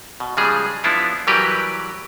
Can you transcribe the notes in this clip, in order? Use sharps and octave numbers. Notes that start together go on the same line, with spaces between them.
B2
C#3 F3 G3 G#3 G#4
F3 B3 D4 E4 F4
E3 F#3 G3 G4 A#4 B4